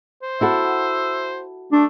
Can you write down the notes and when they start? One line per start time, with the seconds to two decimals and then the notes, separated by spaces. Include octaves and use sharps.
0.23 C5
0.41 E4 F#4 A4 E5
1.72 A3 D4